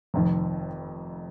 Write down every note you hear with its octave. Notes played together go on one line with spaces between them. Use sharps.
F1 F2 D#3